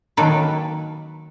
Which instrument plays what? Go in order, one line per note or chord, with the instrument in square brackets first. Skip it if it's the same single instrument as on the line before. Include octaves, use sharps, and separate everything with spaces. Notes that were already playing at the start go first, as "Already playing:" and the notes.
[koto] D#3 F#3 A#3 A4 B4